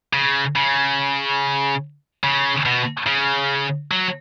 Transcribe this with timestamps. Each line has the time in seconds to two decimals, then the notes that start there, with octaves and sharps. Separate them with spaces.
0.13 C#3
0.56 C#3
2.24 C#3
2.66 B2
3.07 C#3
3.91 F#3